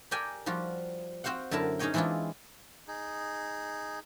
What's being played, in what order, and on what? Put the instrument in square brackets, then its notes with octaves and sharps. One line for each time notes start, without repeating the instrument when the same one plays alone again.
[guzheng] G4 A4 A#4 D5 G5 G#5
F3 G3 F4 F#4
C4 F#4 C5 F5 F#5
F#2 D3 E4 A#4 A5 A#5
C#4 D#4 G#4 C#5 D#5 G5
E3 G#3 C4 D4 E4 F4
[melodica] D#4 G#4